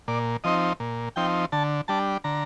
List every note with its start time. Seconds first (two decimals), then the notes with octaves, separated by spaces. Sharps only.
0.08 A#2 D5
0.44 F3 C4 D#4 D#5
0.80 A#2
1.16 F3 C4 D#4 G5
1.52 D3 A5
1.88 G3 D4 A5
2.24 D3 A#5